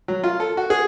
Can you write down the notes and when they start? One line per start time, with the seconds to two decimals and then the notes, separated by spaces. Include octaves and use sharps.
0.08 F#3
0.24 F4
0.40 A4
0.57 F#4
0.70 G#4